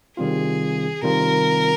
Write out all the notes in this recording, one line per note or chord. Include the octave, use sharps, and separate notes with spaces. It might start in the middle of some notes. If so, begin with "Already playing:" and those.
C3 D#3 G3 C4 F4 G#4
C3 D#3 G3 C4 F4 A#4